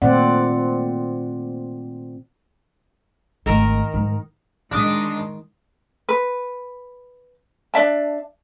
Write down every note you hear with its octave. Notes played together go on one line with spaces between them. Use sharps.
A#2 D#3 A3 C4 D5 F#5
G#1 D#3 A3 A#4
G#2
D#3 G#3 D4 D6 D#6
B4
D4 D5 E5 A5